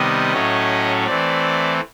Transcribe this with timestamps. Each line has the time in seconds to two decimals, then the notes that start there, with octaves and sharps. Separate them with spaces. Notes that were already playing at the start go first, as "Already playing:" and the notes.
Already playing: C3 D#3 G3 B3 D#5
0.32 A2 F#3 A3 C#4
1.06 E3 A3 C4 D5